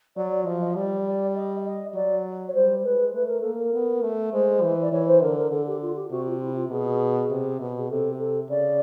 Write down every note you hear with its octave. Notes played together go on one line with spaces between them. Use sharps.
F#3 D5
D5
F3 D#5
D#5
G3 D5
D5
D#5
D#5
F#3 D5
C#5
G3 C5
G#3 B4
A3 B4
A#4
A#3 A4
A#4
B3
A3
G#3 C5
E3
D5
E3 C#5
C5
D3 A#4
A#4
D3 A4
G4
F4
G4
C3 F#4
F4
E4
F4
B2 G#4
C3
B2
G#4
C3 A4
A4
C#3 D5